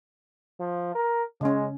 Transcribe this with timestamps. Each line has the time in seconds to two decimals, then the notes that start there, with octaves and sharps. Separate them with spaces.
0.60 F3
0.95 A#4
1.41 C#3 G#3 C#4